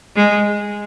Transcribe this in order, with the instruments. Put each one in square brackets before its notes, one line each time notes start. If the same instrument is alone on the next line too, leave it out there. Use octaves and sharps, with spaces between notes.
[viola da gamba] G#3